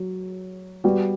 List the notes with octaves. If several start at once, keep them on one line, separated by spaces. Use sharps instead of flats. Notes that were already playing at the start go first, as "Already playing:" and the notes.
Already playing: F#3
G3 B3 F#4